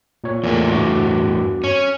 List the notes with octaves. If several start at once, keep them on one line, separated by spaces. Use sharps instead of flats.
A#2 C#5
E2 A#2 A3
G2 F#4 D6
C#4